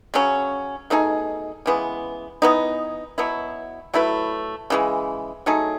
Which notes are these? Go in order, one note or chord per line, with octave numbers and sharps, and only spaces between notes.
C#3 F#3 C#4
B2 A3 D#4 G#4
C#3 E3 G#3 B3
E3 B3 D#4
B2 F#3 B3 E4
F#3 A3 E4 B4
C#3 E3 G#3
F#3 A3 D#4 G#4